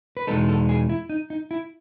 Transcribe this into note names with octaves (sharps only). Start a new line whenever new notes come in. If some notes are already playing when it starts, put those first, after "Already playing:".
B4
E2 B2 G#3 B3 D#4 A4
A4
G#4
E4
D#4
D#4
E4